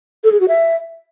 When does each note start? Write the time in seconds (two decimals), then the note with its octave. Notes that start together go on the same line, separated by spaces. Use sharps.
0.24 A4
0.32 G#4
0.40 F#4
0.48 E5